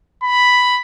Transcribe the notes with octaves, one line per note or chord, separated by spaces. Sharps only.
B5